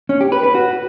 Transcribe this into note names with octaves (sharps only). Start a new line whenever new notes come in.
C#4
G4
B4
B4
F#4